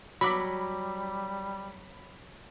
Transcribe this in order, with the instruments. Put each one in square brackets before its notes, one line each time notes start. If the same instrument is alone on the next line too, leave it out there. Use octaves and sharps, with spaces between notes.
[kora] F#3 [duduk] G3 [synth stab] B5 [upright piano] D6 E6